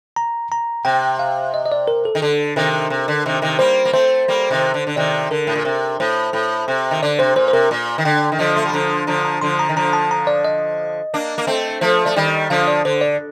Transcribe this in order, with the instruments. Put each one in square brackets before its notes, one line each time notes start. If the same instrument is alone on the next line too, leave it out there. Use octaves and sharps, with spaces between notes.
[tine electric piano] A#5
A#5
[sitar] C3 [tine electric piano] G5
[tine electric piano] F5
D#5
D#5
D5
A#4
A4
[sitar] D#3
[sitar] D3 [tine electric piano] A4
[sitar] C3 D#3 [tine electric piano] A#4
[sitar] C3
D3
C3 D#3
C3 D#3
[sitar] G3 A#3 [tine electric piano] C5
[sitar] A#3
[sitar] A3 C4 [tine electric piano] C5
[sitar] G3 A#3
C3 D#3
D3
D3
[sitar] C3 D#3 [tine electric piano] D5
[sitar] D3 [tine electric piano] A#4
[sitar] A2
A#2
[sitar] C3 [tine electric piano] A#4
[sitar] A2 [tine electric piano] C5
[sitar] A2
C3
D#3
[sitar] D3 [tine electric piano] D5
[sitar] C3 [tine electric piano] C5
[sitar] A#2 [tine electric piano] C5
[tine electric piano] C5
[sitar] C3 [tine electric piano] A#4
[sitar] A#2
D#3
[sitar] D3 [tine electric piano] G5
[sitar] D#3
[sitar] D3 F3 [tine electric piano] D#5
[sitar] A3 [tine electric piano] C6
[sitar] G3
[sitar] D3 F3 [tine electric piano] A#5
[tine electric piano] C6
[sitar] D3 F3 [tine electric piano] A#5
[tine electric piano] A#5
[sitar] D3 F3 [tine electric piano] C6
[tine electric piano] A#5
[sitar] D#3
[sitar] D3 F3 [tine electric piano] A#5
[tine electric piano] A5
A#5
D5
D#5
[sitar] A#3 D4
A#3
A3 C4
[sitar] F3 A3 [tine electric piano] C5
[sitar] A3 [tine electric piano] D5
[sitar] D#3 G3
[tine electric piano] D#5
[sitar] D3 F3 [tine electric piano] F5
[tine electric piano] D5
[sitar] D3 [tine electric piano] C5
[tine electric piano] D5